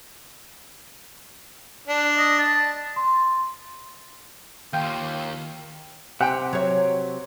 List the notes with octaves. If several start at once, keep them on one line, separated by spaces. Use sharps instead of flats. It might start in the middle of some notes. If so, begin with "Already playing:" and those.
D4
D#5
A5
C6
D#2 F4 G5 G6
C3 F#5 G5
F#3 C#5